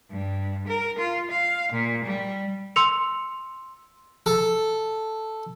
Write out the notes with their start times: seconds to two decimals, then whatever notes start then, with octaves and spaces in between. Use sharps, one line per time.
0.11 G2
0.67 A#4
0.98 F4
1.30 F5
1.72 A#2
2.04 G3
2.76 C6 E6 C#7 F7
4.26 A4